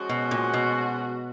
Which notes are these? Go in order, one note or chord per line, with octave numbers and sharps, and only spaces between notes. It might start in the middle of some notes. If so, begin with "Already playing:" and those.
Already playing: F3 G#3 C#4 F#4
B2
A#2
B2